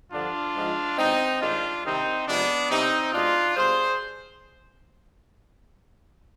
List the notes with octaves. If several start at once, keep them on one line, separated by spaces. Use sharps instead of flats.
G2 D3 F3 D4 F4
G#2 F3 G#3
B2 G#3 C4 D#4
G2 D#3 G#3 D4 F4
C3 D#3 G3 C4 D#4
C3 F3 G#3 B3 D4
C3 G3 C4 D#4
B2 G#3 D4 F4
B2 G3 G#4 C5